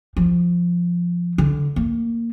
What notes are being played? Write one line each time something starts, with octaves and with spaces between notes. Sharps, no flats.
F3
D3
A#3